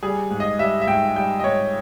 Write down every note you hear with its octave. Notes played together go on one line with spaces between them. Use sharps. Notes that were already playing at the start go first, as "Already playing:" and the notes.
G3 G#4
G#2
D#5
G3 E5
E5
G#2 G5
G3 G5
D#5
G#2 C#5